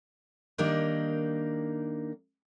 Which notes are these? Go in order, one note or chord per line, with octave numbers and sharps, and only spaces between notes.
D#3 G3 A#3 D4 D#4